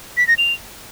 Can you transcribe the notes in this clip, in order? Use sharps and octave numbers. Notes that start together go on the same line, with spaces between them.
B6
A#6
F7